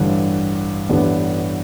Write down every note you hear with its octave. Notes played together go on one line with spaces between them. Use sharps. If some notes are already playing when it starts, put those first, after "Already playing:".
Already playing: A1 G2 D3
A1 G2 D3 G3 B3